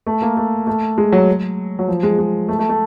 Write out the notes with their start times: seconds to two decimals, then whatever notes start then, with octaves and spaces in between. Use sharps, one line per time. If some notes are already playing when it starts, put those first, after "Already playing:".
0.07 A3
0.22 A#3
0.37 A3
0.67 A3
0.98 G#3
1.12 F#3
1.79 F#3
1.88 F3
2.03 G#3
2.19 G#3
2.48 A3
2.59 A3
2.69 A3